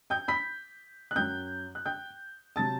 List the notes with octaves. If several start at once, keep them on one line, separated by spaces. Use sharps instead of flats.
G5 G6
B5 B6
F#6
F#2 F#3 G5 G6
F#6
G5 G6
C3 F#3 A5 A6